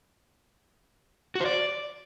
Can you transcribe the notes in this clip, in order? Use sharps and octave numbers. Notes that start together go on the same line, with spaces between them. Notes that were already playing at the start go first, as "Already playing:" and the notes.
F#4
C5
D5